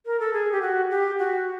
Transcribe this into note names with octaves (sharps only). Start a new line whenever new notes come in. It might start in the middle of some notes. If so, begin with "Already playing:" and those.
A#4
A4
G#4
G4
F#4
G4
F#4